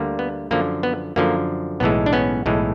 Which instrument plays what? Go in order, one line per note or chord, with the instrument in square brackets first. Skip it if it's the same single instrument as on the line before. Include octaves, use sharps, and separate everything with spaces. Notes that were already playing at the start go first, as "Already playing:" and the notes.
Already playing: [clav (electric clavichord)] D2 D3 G3 A#3
B3
F#2 D3 F3 A#3
B3
F#2 D3 F3 A#3
B1 A2 E3 G#3 B3
D4
B3 C#4
B1 A2 E3 G#3